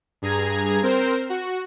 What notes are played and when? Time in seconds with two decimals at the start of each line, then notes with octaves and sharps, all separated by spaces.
0.22 G2 G#4 A#5 G#6
0.83 C4 A#4 C5
1.29 F#4